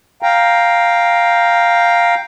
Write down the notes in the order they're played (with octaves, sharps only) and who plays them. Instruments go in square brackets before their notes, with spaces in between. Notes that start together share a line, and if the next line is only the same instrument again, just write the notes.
[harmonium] F5 G5 A#5